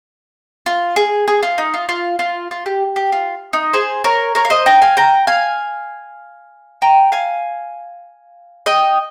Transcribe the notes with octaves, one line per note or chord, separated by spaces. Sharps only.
F4
G#4
G#4
F4
D#4
F4
F4
F4
F4
G4
G4
F4
D#4
G#4 C5
A#4 C#5
A#4 C#5
F5
C5 D#5
G5 A#5
F5 G#5
G5 A#5
F5 G#5
G5 A#5
F5 G#5
D#5 G5